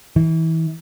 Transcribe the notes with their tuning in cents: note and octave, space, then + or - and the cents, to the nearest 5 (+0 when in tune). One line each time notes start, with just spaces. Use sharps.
E3 -30